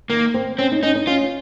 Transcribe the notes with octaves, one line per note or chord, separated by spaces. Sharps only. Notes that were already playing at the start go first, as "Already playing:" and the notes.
D#3 A#3
C4
C4 C#4
D#4
C#4 D#4
D#4
C#4 F4